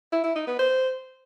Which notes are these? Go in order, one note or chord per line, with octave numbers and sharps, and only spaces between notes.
E4
E4
D#4
B3
C5